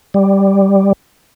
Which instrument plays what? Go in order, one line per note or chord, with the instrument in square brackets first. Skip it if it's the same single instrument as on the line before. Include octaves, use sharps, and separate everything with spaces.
[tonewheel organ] G3